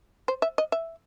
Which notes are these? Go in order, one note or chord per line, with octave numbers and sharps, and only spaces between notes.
C5
E5
D#5
E5